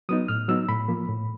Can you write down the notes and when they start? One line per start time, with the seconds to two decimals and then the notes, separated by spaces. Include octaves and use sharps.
0.09 F#3 B3 D#4 D#6
0.28 A2 F6
0.48 F#3 B3 D#4 E6
0.69 A2 B5
0.88 F3 A#3
1.08 A2